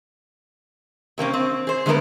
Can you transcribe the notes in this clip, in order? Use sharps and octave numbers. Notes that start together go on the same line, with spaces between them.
C3 A#3 C4 C#4
C4
G#4 C5
D3 G#3 A3 B3 A#4